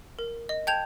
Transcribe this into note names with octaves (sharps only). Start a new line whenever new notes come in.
A#4
D#5
G5 A5 G6 G#6 F7